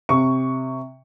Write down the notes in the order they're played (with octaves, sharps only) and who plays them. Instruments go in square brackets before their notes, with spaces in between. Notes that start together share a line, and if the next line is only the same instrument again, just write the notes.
[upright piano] C3 C#6